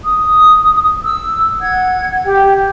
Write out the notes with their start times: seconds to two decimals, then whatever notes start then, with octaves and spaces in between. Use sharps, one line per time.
0.03 D#6
1.04 E6
1.61 F#5 G#6
2.25 G4 G5